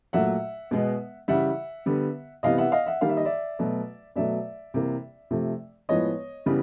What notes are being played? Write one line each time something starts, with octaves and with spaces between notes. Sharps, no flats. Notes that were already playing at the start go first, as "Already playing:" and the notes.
A#2 F#3 A3 E5 F#5
B2 G#3 B3
C#3 E3 G3 E5 F#5
D3 G3 B3
C3 E3 G3 B3 D#5 F5
E5 F#5
D#5 F5
E5 F#5
D#3 G3 A#3 F5
E5
D#5
D5 E5
B2 F#3 A3
B2 F#3 A3 D5 E5
C3 E3 G3 A#3
C3 F3 A3
A2 F3 G#3 B3 C#5 D#5
C#3 E3 G3 B3